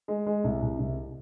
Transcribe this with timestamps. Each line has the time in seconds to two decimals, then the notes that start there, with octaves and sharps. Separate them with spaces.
0.08 G#3
0.26 G#3
0.44 C2
0.62 C2
0.79 C2